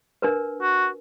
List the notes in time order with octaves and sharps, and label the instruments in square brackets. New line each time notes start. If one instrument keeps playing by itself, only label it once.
[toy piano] D4 A#4 B4
[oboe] F#4